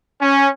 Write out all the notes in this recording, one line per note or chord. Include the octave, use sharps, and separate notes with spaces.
C#4